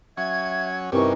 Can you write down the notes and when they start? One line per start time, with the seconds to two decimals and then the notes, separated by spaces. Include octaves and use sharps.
0.17 F#3 C#4 E5 G#6
0.92 G2 C3 E3 C#4 D#4 A#4 C#6